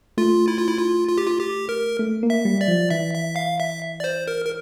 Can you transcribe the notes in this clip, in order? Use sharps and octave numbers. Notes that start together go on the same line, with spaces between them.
A3 F4
E4
F4
E4
F4
F4
G4
F4
G4
A#4
A3
A#3
E5
G3
D5
F3
E3 E5
E5
F5
E5
D5
C5
A#4
A#4